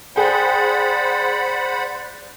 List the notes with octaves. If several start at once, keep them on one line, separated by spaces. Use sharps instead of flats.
G#4 C5 D5 F#5 G5 B5